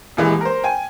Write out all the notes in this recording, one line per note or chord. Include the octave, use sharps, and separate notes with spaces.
D#1 E3 G#3
A#4 C5
G5 G#5